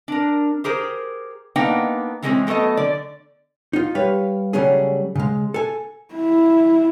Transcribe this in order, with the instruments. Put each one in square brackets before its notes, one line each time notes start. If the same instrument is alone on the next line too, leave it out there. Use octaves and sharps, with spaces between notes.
[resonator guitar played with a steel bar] D4 A#4
G4 G#4 A#4 C5
A#3 B3 D4 D#4 F#5 G5
E3 F#3 G#3 A3 C4 C#4
F#3 A3 B3 A4 D#5
D3 D5
[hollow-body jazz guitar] D#4 F4
G3 B4 C#5 F5
C#3 F#3 G3 A3 C#4 G#4
C#3 G#3
A4 G#5
[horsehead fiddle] E4